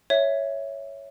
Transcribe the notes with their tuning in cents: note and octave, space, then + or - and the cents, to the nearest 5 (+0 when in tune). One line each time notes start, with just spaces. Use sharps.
C#5 +0 E5 +0